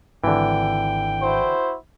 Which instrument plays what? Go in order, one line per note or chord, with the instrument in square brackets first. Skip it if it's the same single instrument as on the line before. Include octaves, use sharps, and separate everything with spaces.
[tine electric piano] G#1 [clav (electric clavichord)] D3 E3 [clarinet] G5
[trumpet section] E4 F#4 C5